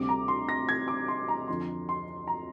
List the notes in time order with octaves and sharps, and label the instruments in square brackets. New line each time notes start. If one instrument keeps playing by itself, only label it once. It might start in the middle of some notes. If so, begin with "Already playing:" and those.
Already playing: [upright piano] D2 C3 G3 C4 D6
A#5
C6
A#6
G#6
D6
C6
A#5
F2 D3 F3 C6
C6
A#5